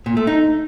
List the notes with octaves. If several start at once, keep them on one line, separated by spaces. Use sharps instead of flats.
A#2
A3
D#4